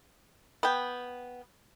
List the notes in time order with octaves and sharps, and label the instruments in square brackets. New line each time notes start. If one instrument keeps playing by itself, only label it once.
[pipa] B3 G5